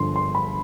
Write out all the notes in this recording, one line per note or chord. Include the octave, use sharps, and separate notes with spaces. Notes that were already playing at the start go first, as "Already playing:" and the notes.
Already playing: G1 G2 D3 F3 C6
C6
B5